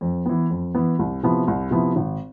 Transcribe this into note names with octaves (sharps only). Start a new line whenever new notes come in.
F2
E3 B3
F2
E3 B3
C2
C3 F3 B3 E4
C2
C3 F3 B3 E4
G#1